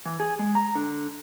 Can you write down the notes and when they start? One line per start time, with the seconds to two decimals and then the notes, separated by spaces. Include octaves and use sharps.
0.06 E3
0.20 G#4
0.39 G#3
0.55 A#5
0.75 D3